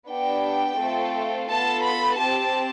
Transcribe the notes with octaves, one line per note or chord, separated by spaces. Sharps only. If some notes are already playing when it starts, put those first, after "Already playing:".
B3 D4 G4 G5
A3 C4 F4 A4
B3 F4 A4 A5
B5
C4 G4 A5